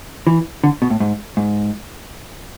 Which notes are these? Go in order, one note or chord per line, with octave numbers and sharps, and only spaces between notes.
E3
D3
B2
A2
G#2
G#2